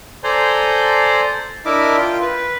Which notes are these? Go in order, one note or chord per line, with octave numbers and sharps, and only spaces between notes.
A4 C5 D5 G#5 A#5 C6
D4 E4 A#4 D#5 E5 D6
F4 G5
B4